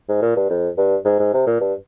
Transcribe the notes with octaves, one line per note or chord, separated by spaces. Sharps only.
G#2
A#2
G2
F2
G2
G#2
G#2
C3
A#2
G2